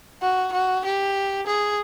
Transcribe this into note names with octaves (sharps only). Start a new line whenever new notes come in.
F#4
F#4
G4
G#4